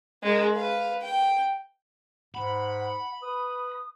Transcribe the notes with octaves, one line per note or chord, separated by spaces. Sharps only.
G#3 A#4
B4 F5
G5
G#2 F#5 B5
B4 D#6